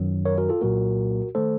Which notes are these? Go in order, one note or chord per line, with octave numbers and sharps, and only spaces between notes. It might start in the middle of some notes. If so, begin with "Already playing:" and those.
Already playing: F#2 D#3 F#3
A#4 C#5
F#4 A#4
F4 A4
C2 A#2 F#3 A#3 F#4 A#4
D#3 A3 A4 C5